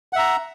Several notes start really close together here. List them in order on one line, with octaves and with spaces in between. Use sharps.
F#5 E5 A#5